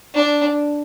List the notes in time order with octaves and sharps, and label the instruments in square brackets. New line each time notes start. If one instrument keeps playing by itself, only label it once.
[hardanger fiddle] D4